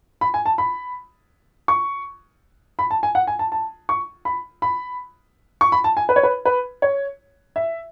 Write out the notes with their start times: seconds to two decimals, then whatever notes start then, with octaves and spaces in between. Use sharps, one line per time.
0.21 B5
0.34 G#5
0.46 A5
0.58 B5
1.68 C#6
2.79 B5
2.91 A5
3.03 G#5
3.15 F#5
3.27 G#5
3.39 A5
3.52 A5
3.89 C#6
4.25 B5
4.62 B5
5.61 C#6
5.72 B5
5.84 A5
5.97 G#5
6.09 B4
6.16 C#5
6.23 B4
6.45 B4
6.82 C#5
7.56 E5